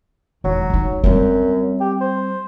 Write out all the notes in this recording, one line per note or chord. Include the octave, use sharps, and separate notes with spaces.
E1 D#3 F#3
G1 D#4
F#2 G3 C4
G4
C5